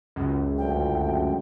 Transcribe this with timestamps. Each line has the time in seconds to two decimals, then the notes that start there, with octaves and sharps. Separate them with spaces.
0.16 C#2 F#2
0.58 D2 G5